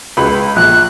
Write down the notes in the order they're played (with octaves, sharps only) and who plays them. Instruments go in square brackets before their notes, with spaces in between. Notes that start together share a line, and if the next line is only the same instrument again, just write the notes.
[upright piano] C#2 B4 B5
[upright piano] A#1 [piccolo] F#6